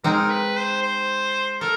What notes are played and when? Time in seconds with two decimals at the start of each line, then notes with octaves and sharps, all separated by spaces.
0.04 G#3 C4 D#4 G#4 A#4
0.30 B4
0.56 C5
0.83 C5
1.61 A4 A#4